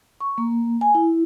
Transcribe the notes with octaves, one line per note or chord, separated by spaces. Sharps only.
C#6
A#3
G#5
E4